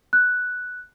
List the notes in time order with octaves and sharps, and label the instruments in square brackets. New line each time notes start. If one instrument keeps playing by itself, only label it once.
[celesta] F#6